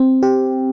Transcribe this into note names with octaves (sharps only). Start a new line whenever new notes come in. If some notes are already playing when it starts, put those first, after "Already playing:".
Already playing: C4
G4